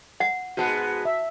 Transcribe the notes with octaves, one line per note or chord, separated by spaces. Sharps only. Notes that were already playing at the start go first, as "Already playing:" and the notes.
F#5
G#2 G#3 B3 F#4 A5 C7
E5